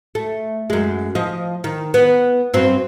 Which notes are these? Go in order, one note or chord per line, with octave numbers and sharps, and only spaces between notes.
A3
F#2 G#3
F3 D#5
D#3
B3
G2 F#3 C4